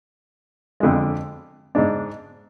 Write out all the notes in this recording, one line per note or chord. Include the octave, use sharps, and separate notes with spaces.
F2 D3 G#3
G#2 G#3 D4